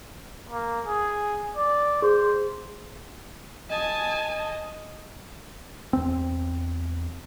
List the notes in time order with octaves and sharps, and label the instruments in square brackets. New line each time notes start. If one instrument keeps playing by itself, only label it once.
[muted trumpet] A#3
G#4
D5
[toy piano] G#4 [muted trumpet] C5
[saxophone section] D#5 [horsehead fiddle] G#5 A5
[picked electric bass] E2 C4